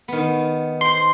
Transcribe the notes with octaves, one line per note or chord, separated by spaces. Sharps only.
D#3 B3
C5 C6